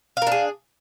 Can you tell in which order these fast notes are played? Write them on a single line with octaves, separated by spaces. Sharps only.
F5 A#4 D4 G#4